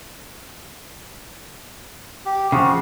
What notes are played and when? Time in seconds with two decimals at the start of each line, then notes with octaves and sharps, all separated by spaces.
2.26 G4
2.52 C#3 F3 F#4